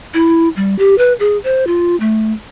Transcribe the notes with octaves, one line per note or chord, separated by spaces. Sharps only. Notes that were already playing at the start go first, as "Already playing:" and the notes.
E4
G3
G4
B4
G#4
C5
F4
A3